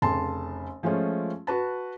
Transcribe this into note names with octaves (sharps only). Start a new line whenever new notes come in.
F1 C#3 A5 C6
F3 G#3 A3 C#4 F4
F#4 B4 A5